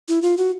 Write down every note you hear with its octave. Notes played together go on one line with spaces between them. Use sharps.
E4
F4
F#4